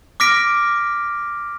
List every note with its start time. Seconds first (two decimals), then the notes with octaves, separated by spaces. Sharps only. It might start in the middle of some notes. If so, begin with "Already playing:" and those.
0.20 D6 F6 A#6 B6 D7